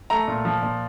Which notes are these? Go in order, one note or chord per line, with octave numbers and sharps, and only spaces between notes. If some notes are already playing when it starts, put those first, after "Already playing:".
A3 A#5
A#2
F3
A#2